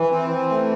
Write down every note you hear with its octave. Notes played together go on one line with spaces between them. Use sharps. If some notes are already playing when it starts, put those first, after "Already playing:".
Already playing: E3
C4
E3
A3